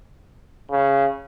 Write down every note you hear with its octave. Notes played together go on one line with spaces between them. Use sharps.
C#3